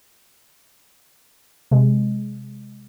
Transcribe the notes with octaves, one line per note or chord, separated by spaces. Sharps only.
C3 G#3